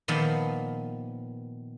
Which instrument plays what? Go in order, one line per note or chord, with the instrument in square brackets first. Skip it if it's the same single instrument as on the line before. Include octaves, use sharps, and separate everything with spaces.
[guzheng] A#2 D#3 F3 B3